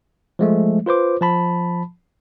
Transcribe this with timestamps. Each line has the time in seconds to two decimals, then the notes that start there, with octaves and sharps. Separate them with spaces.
0.39 F3 G#3 A3
0.86 F4 B4 C5 D6
1.21 F3 A5 B5